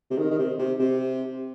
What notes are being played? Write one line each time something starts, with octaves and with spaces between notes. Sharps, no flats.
C3
D#3
D#3
C3
C3
C3